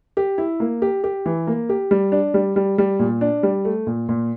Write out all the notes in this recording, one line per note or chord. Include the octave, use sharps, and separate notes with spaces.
G4
E4
A#3
G4
G4
E3
A#3
G4
G3
D4
G3
G3
G3
A#2
D4
G3
A3
A#2
A#2